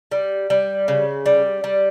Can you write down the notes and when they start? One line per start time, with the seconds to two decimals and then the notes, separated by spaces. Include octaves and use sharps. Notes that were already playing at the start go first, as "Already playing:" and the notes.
0.11 G3
0.50 G3
0.88 C#3
1.26 G3
1.64 G3